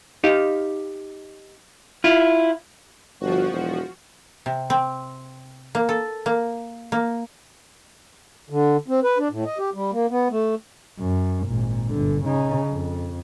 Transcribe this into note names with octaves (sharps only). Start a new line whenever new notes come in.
D#4 G4 F5
E4 F4
G1 F3 F#4
E1
C3
C4
A#3
A4
A#3
A#3
D3
C4
B4
D4
A2
D#5
G4
G3
A#3
B3
A3
F#2
G#1 A#2
G1 D3
C#3 D#4
F2